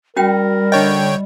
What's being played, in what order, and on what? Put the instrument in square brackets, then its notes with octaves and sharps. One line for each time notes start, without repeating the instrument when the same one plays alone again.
[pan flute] G3 [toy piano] C#4 F#4 G5 [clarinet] A#4
[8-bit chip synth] D3 C#5 G5 [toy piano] D#5